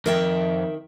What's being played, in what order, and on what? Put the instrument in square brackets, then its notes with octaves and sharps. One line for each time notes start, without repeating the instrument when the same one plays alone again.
[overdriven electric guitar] F2 [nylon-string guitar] D#3 [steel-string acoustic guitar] A#4 E5 G5